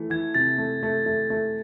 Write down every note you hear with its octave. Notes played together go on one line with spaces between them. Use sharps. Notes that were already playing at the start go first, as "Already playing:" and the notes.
Already playing: E3 A3
E3 G#6
C3 A6
A3
A3
A3
A3